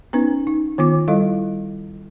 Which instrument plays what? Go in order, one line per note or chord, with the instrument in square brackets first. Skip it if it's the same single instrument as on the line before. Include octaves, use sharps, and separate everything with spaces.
[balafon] B3 C#4 D#4 B4
D#4
D#3 B3 F4 D6
G3 E4 A4 D#5 F5